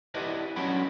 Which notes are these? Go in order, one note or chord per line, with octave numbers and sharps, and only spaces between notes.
E4 G4 B4 D5 D#5
F#3 C#4 D4 F#4 G5 B5